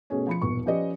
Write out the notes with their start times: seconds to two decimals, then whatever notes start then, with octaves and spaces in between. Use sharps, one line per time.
0.10 B2 A3 C#4 G#4 C#5
0.27 F3 B5 C#7
0.42 D#1 B1 E2 C#6
0.66 F3 C#4 G4 B4 D5 D#5